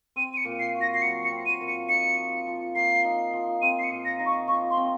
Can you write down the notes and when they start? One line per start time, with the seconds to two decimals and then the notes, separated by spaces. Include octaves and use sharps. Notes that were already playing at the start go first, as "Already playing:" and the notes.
0.16 C4 D#7
0.33 D#7
0.37 C#7
0.45 A#2
0.60 C7
0.74 F#4
0.81 A#6
0.94 C7
1.02 F#3 C#7
1.24 C#7
1.31 C4
1.46 D#7
1.61 A#2
1.67 C#7
1.89 D#4 C#7
2.18 F3
2.47 F3
2.75 A#3 C7
3.05 D#4
3.33 F3
3.62 C4 D#7
3.79 C7
3.84 C#7
3.90 A#2
4.05 A#6
4.19 D#4
4.26 C#6
4.48 F3 C#6
4.70 C6
4.77 C4